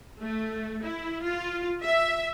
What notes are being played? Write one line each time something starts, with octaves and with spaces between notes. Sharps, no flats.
A3
E4
F4
E5